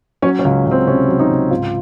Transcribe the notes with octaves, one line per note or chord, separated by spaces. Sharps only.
F#3 C#4
C#4
C#2
C#2
C4
C3 C#4
F#3
D#4
C#2
G#2 F4